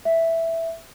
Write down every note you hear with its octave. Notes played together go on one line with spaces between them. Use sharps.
E5